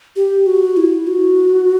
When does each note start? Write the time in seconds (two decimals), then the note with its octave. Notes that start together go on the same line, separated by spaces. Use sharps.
0.16 G4
0.46 F#4
0.77 E4
1.07 F#4